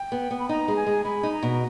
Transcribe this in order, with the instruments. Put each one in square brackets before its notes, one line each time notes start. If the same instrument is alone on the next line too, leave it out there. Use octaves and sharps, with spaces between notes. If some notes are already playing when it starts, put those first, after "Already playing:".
Already playing: [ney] G5
[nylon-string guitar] B3
B3
[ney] B5
[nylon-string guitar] D#4 [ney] A#5
[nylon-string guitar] G#3
[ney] G#5
[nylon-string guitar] G#3
[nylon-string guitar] G#3 [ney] B5
[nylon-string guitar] D#4
[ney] A#5
[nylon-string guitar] B2